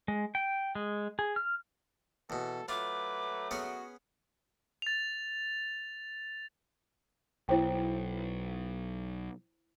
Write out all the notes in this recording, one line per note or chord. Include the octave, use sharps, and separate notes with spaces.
G#3
G5
G#3
G#4
F6
E2 B2 A4
F#3 A3 F4 B4 D6
B3 C#4 F#4 G#4
A6 F7
B1 E4 C5 G5